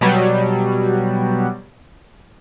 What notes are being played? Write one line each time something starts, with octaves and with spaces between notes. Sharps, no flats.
B2 F#3 G3